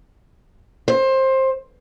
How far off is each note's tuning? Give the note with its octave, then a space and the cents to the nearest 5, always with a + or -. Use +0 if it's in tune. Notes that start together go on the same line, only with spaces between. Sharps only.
C5 +20